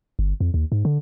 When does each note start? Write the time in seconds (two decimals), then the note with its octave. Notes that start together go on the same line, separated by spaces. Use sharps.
0.19 G1
0.40 F2
0.54 D#2
0.72 G#2
0.85 D3